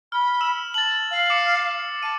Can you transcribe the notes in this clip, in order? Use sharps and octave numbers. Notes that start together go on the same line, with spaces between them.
B5 F6
E6 E7
A5 A6 F#7
F5
D6 C#7
A5 D#7